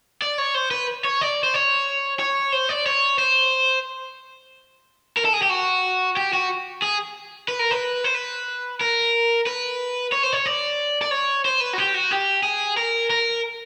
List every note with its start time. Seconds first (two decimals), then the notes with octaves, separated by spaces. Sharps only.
0.22 D5
0.38 C#5
0.54 C5
0.71 B4
1.04 C#5
1.21 D5
1.44 C5
1.54 C#5
2.19 C#5
2.52 C5
2.69 D5
2.86 C#5
3.18 C5
5.17 A#4
5.25 A4
5.33 G#4
5.42 G4
5.50 F#4
6.17 G4
6.33 F#4
6.82 G#4
7.48 B4
7.59 A#4
7.71 B4
8.04 C5
8.15 B4
8.81 A#4
9.46 B4
10.12 C#5
10.23 C5
10.33 C#5
10.46 D5
11.02 D5
11.11 C#5
11.45 C5
11.60 B4
11.73 F#4
11.78 G4
11.94 F#4
12.11 G4
12.43 G#4
12.77 A#4
13.10 A#4